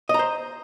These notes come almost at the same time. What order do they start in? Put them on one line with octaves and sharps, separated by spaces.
D#5 A#5 C5